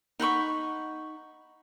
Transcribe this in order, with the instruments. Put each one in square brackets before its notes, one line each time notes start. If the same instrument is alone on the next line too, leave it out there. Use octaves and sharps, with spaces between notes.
[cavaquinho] D#4 F#5 B5 C#6